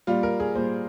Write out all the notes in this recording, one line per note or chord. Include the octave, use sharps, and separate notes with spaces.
A#2 G3 F4
A#4
G#4
A#2 G3 C5